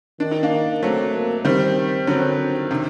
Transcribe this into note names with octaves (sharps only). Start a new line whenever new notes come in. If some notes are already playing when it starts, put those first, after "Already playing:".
D#3 D4
D#4
A#3 D4
F#3 A3 C4
A#3
D#3 G3 C4
D3 F#3 C4
C3 D#3